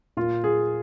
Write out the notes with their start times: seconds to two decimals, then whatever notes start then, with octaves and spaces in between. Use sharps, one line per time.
0.17 A#2 A#3 F4
0.44 G#4